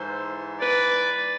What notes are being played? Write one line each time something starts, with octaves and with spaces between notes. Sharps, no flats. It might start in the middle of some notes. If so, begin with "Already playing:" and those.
Already playing: G#2 E3 A4 C5
B4 D5